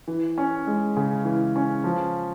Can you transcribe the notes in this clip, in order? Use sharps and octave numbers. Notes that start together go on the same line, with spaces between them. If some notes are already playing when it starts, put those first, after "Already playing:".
E3
C#4
G#3
C#3
E3
C#4
F3